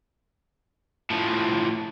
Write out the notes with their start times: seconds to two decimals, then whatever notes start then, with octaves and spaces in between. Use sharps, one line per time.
1.10 A2 F3